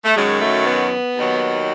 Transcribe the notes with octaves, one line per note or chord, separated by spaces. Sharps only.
A3
F#2 D#3 F#3 G#3
A3
B3
D#2 D#3 F#3